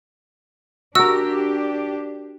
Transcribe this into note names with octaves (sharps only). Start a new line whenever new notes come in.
D4 F#4 G4 A#4 E6